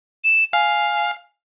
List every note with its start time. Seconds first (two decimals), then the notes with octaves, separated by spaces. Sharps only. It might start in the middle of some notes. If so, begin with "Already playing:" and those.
0.24 E7
0.53 F5 G#5